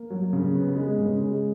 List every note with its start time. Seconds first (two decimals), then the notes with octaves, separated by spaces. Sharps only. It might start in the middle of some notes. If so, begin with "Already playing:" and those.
Already playing: A#3
0.10 F#3
0.33 C#3
0.55 B3
0.76 G#3
0.98 C#3
1.20 G#3